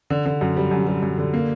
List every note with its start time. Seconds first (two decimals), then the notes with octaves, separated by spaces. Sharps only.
0.10 D3
0.26 D3
0.41 F#2
0.57 G3
0.71 F#2
0.87 G3
1.02 F#2
1.18 D3
1.34 A#3